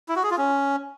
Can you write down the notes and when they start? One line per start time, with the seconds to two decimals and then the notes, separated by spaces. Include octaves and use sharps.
0.09 E4
0.16 F#4
0.23 G#4
0.31 F4
0.38 C#4